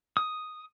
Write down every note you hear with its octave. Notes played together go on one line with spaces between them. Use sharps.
D#6